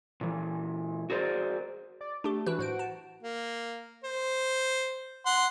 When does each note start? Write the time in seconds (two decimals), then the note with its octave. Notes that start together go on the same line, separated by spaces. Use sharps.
0.21 A#2 E3
1.10 F#4 G#4 A#4 C5 D5
2.01 D5
2.24 A3 D4 G4
2.47 E3 D4 F#4 B4
2.59 A2 F#4 C5 D7
2.79 A5
3.23 A#3
4.04 C5
5.26 F#5 C6